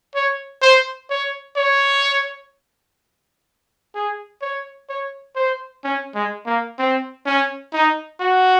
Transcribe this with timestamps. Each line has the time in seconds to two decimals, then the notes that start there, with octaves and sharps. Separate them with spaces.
0.15 C#5
0.62 C5
1.10 C#5
1.57 C#5
3.95 G#4
4.42 C#5
4.89 C#5
5.36 C5
5.84 C#4
6.15 G#3
6.46 A#3
6.79 C4
7.26 C#4
7.73 D#4
8.20 F#4